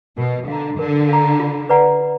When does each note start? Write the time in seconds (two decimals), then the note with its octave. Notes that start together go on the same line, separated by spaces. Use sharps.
0.18 B2 A#4
0.48 D3 F5 A#5
0.79 D3 A#4
1.09 F5 A#5
1.40 F4
1.69 B4 D5 F#5 A#5
2.01 F4